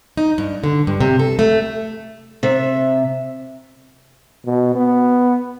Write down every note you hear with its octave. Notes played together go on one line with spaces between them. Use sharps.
D#4
G2
D3
G2
C3
A4
A3
C3 E5
B2
B3